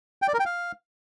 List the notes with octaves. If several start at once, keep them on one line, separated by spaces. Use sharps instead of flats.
G5
D5
A#4
G5
F5